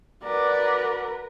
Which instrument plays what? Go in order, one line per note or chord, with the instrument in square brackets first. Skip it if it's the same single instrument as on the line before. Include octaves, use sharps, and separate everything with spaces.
[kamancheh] F#4 D5 [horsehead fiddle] A#4 B4